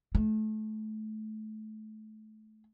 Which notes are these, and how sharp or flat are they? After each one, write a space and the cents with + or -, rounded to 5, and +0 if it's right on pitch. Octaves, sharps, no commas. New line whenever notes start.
A3 -25